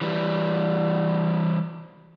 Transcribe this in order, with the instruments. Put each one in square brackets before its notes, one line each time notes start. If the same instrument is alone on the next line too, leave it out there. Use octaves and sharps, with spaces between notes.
[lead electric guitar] E3 G3